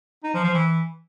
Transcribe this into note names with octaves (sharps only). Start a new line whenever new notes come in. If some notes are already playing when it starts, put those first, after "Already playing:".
D#4
F3
F3
E3